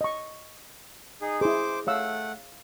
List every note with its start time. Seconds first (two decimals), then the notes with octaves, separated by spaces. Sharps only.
0.01 D#5 C#6
1.22 D#4 G#4
1.41 E4 G#4 C5 D6
1.87 A3 C#5 F5 F#5 E6